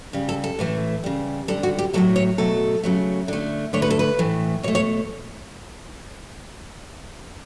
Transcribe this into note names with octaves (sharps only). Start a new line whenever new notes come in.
C#3 G3
A4
A4
A2 E3 A3
C#3 G3
D3 G3 A4
F#4
G4
A2 F#3 A3 A4
C#5
B2 F#3 A3 A4
C#3 F#3 A3
D3 A3
D3 A3 C#5
B4
A4
B4
A2 E3 A3
B2 A3 C#5
C#5